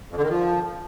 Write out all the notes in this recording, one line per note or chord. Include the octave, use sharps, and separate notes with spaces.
F2
D3
D#3
F3